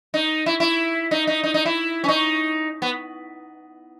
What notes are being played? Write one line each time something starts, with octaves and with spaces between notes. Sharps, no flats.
D#4
E4
E4
D#4
D#4
D#4
D#4
E4
C#4
D#4
B3